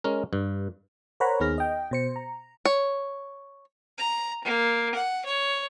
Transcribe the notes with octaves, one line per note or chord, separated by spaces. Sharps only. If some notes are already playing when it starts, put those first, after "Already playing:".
G#3 C#4 A#4
G2
A#4 C5 C#5 F#5 A#5 B5
D#2 B3 D#4 G#4 F6 A#6
D#5 G5
B2 C5 C#7
A#5
C#5
A#5
A#3
F#5
C#5